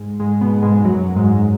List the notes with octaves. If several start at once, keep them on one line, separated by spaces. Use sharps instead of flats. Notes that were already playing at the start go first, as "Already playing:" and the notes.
Already playing: G#2 G#3
G#2 G#3
B2 B3
G#2 G#3
F#2 F#3
G#2 G#3